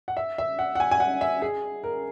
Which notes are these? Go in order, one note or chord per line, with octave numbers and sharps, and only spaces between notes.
F#5
E5
E5
F#5
F#5
G#5
G#5
F#5
E5
G#4
A#4